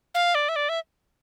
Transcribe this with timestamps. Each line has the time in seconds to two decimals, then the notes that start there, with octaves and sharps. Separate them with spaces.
0.15 F5
0.35 D5
0.49 E5
0.56 D5
0.69 E5